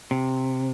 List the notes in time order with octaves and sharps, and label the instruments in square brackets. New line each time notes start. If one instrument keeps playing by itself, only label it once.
[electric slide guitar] C3